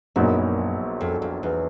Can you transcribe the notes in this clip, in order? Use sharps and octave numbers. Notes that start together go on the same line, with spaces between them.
A#1 F#2 A#2 F#3 B3 D#4
F2
F2
E2